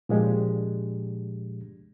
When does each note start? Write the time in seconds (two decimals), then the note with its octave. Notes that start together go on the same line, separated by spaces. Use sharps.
0.09 A#2 F3 G#3 D4 G4